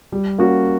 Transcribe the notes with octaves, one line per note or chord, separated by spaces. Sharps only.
G3
A#3 C#4 F#4